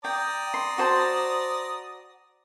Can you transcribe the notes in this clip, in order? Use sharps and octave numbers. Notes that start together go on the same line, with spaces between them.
D5 G5 A#5 D#6
C6
F#4 C5 A5